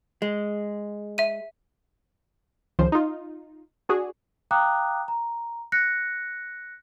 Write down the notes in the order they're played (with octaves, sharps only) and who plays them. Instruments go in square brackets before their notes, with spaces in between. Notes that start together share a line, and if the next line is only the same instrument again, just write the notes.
[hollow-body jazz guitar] G#3
[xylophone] E5 D#7
[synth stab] C#2 D#3 F3 C5
D#4 F4
D4 F#4 G#4
[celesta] F5 G5 A#5 D6 D#6 F#6
A#5
F#6 A#6 C#7